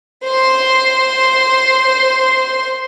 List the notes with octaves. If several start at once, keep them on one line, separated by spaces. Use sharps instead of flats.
C5 C6